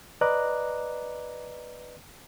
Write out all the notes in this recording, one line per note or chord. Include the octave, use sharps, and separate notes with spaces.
B4 D5 D#5 A#5 D6 F#6